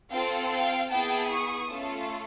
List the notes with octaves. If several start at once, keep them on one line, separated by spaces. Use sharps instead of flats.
C4 F4 A4 F5 G5
F5 G5
B3 E4 G#4 G5 A5
C#6 D#6
A3 C#4 F4 A4